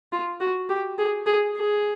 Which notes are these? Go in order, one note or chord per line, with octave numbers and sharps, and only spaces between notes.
F4
F#4
G4
G#4
G#4
G#4